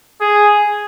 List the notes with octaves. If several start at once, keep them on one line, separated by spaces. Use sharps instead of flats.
G#4